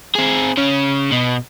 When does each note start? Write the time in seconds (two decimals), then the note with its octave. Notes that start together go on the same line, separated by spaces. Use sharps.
0.15 C4 G#4
0.58 C#3 C#4
1.12 B2